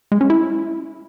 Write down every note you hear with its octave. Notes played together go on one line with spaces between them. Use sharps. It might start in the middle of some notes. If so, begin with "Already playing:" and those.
G#3
C#4
E4